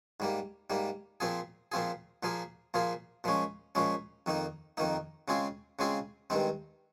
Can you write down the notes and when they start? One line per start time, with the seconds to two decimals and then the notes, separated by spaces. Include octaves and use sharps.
0.20 G#2 G3 A#3
0.70 G#2 G3 A#3
1.20 A#2 F3 C4 F4 G#4
1.72 A#2 F3 C4 F4 G#4
2.23 A#2 F3 A#3 F4 G#4
2.74 A#2 F3 A#3 F4 G#4
3.24 A#2 F3 G#3 C#4
3.75 A#2 F3 G#3 C#4
4.26 F2 D#3 A#3 D#4
4.77 F2 D#3 A#3 D#4
5.28 C#3 G#3 C4 F4 G#4
5.79 C#3 G#3 C4 F4 G#4
6.30 G2 D#3 G#3 C4